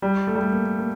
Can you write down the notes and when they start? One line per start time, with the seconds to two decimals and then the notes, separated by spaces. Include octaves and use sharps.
0.02 G3
0.27 A3
0.35 G3
0.43 A3
0.53 A#3
0.79 A#3